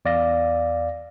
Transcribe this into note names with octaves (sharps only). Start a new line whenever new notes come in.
E2 D5 F5 A#6